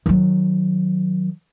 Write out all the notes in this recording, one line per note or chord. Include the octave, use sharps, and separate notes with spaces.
D#3 F#3